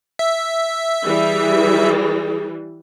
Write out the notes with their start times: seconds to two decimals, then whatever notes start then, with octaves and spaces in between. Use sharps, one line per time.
0.19 E5
1.05 E3 G3 G#4